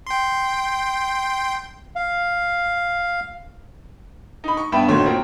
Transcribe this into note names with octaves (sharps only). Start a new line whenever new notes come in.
G5 C6
F5
D#4 B5
C#6
G2 B3 E5 G5 B5 E7
A#1 D#3 A3 F#4 C#5 C6
C4 F4 A#4